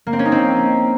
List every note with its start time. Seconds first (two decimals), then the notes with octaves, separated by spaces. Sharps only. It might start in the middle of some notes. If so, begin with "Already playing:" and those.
0.07 A#3
0.13 C4
0.19 C#4
0.26 D#4
0.32 C4